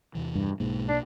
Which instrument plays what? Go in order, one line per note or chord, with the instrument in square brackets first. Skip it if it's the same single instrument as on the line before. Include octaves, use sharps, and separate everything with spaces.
[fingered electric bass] E2 C3 E3
[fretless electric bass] G2
[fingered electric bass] B1 B2 A#3 [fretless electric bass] G#2
[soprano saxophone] D4